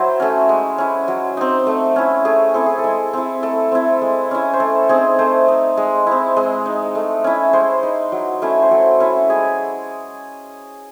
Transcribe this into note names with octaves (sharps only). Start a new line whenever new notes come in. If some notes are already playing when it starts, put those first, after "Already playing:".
Already playing: F#3 E4 C5
A3 C#4
G#3
C#4 E4
F#3
C4 D#4
A3
C#4 E4
A3 G#4
C4 E4 A4
G#4
A4
G#3
C4 E4
A3 A4
C4 E4
G#3
C#4 E4
C5
A3 A4
C4 D#4 G#4
A3 C5
D#4
G#3
C4 E4
G#3
D#4
A3
C#4 E4
G#3 C5
D#4
F#3
A3 C#4 E4
C5
F#3 A4
C#4 E4
G#3 G#4